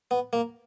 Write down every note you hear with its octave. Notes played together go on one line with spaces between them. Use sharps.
B3
A#3